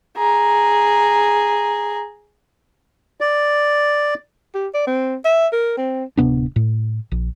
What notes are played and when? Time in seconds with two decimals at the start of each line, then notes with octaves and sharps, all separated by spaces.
0.17 G#4 A#5
3.21 D5
4.55 G4
4.74 D5
4.87 C4
5.25 E5
5.53 A#4
5.77 C4
6.17 D1 C3 B3 D4
6.56 A2
7.12 A#1